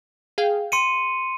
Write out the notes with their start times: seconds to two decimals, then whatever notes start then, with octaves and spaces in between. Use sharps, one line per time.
0.38 G#4 F5 G5
0.72 C6 C#7 D#7